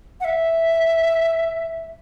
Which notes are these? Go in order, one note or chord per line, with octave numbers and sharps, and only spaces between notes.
F#5
E5